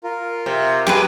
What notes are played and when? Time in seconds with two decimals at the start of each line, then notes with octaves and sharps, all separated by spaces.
0.04 F4 A#4
0.46 C3
0.87 F#2 G4 G#4 B4